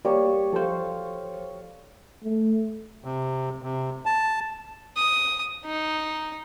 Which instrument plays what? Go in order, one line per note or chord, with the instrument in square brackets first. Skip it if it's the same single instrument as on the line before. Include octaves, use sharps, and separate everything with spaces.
[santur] G3 C#5 [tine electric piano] A#3
[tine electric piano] F3 C5 [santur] A4 F5
[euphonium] A3
[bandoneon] C3
C3
A5
[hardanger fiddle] D#6
D#4